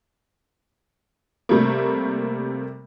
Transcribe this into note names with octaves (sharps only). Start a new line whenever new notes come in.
C3 G3 A3 A#3